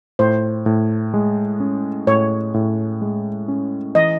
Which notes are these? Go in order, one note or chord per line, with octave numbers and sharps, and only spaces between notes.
A2 C5
A2
G#3
C#4
A2 C#5
A2
G#3
C#4
E3 D#5